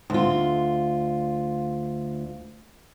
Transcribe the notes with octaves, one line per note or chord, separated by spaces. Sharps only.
D2 F4